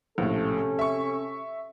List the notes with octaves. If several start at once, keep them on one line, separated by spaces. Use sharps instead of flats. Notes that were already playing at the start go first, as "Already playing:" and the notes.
A#1 A2 C3 C#4 A4
E5 C#6